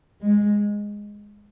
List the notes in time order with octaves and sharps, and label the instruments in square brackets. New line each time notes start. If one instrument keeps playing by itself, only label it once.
[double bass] G#3